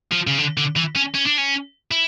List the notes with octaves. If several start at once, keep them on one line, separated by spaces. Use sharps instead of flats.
F3
C#3
D3
D3
E3
C#4
C#4
D4
C#4
E4